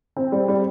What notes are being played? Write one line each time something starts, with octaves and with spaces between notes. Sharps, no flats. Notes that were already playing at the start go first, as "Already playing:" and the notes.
C4
G3
G3